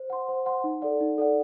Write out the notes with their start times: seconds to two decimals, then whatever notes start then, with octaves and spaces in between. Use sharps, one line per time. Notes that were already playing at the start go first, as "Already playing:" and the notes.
Already playing: C5
0.10 F#5 C6
0.28 C5
0.46 F#5 C6
0.64 D#4
0.82 A4 D5 F#5
1.01 D#4
1.18 A4 D5 F#5